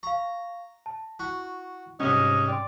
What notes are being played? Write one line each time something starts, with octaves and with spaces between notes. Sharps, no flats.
F5 A#5 C#6
A5
E4 F#4 C#6
C2 G#2 C#4 D#5
D5 G5 C6